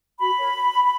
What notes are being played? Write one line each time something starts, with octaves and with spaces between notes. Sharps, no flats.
F#4 B5
A#4 C#5